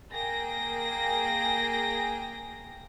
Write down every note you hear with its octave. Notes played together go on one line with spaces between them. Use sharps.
A#3 G#4 G5 A#6